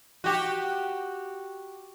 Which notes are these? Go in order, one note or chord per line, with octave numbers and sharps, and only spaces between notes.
F#4 G4